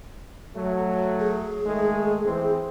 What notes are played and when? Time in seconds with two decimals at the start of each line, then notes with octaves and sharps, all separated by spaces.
0.56 F#3 A3
1.20 G#4
1.66 D#3 G#3 A3
2.26 E3 C4